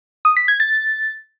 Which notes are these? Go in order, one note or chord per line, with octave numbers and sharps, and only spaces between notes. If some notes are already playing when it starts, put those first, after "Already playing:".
D#6
B6
G#6
A6